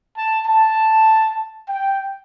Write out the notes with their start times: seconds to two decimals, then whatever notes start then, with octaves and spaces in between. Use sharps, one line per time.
0.16 A5
0.47 A5
1.69 G5